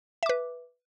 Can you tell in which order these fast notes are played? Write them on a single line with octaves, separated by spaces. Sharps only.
E5 D6 B4